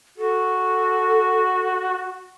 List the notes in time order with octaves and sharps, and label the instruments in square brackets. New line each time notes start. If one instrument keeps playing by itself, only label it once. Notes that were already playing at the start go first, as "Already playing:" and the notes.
[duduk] F#4 [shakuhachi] A4